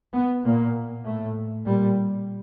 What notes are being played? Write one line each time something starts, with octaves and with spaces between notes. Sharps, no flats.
B3
A#2 A#3
A2 A3
A#2 G3